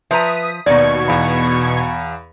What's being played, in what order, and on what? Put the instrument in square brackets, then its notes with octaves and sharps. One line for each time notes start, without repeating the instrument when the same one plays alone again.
[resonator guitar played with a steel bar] F3 A#5 [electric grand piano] B4 E5 [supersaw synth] D#6 B6
[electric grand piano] D#2 [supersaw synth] B2 C#6 G#6 [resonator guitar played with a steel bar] D#4 D5
[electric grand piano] E2 F5 B5